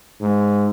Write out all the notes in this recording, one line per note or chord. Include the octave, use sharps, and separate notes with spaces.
G#2